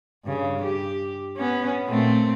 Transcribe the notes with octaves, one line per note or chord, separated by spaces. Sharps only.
G2 C#3
G4
B3 C#4
A#2 A3 C4